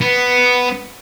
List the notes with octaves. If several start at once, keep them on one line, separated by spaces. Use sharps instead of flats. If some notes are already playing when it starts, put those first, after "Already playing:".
B3